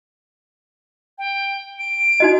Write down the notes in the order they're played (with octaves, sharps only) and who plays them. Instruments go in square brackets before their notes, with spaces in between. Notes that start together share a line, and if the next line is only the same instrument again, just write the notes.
[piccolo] G5
D7
[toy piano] D#4 F#4 D#5